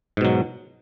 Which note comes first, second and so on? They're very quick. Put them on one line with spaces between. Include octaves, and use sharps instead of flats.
G#2 B2 F#3